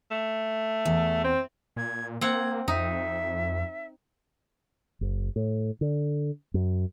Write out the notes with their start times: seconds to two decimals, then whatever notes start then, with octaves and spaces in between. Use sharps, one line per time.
0.11 A3
0.85 E2
1.24 C4
1.76 A#2 G#6
2.21 A#3 C4 F#5 G#6
2.68 F2 D#4 E5
5.01 F#1
5.36 A2
5.81 D3
6.54 F#2